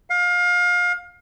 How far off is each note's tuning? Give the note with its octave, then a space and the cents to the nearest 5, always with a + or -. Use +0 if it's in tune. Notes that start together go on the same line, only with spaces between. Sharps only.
F5 +30